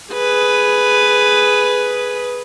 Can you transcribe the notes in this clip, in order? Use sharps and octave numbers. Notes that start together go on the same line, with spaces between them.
G#4 B4